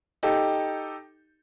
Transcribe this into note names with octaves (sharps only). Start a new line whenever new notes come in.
D#4 G4 A4